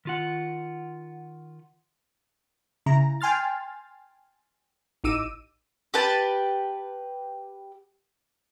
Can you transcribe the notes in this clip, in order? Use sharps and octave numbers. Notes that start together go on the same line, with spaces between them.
D#3 F4 F#5
C#3 E4 A#5
G5 G#5 C6 F6 A6
A1 D#4 D6 E6 D#7
G4 B4 A5